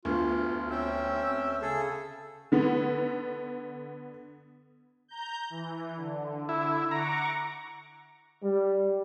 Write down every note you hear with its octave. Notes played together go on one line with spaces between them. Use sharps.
D2 B3 F4
C4 C#4 E5 G5
C#3 G#4 A4
D3 B3
A#5 G6
E3
D3
E4
F#5 A#5 C#6 D6
G3